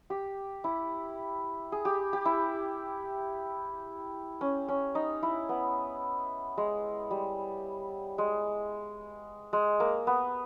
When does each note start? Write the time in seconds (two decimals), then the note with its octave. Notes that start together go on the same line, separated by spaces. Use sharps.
0.10 G4
0.64 E4
1.72 G#4
1.85 G4
2.13 G4
2.25 E4
4.41 C#4
4.68 C#4
4.95 D#4
5.23 E4
5.49 B3
6.57 G#3
7.11 G3
8.18 G#3
9.53 G#3
9.80 A#3
10.07 B3